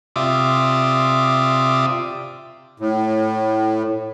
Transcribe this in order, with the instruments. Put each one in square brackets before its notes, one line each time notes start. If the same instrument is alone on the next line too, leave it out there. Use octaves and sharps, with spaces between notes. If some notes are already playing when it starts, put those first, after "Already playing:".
[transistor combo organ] C3 F4 D5 E5 D6 D#6
[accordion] A2